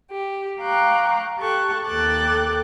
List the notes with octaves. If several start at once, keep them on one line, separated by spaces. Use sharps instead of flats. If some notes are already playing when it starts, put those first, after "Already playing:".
G4
F5 G5 A#5 C#6 D6 F#6
G4 A4 A5 C#6 F#6
D#2 A4 G5 D6 F#6 A6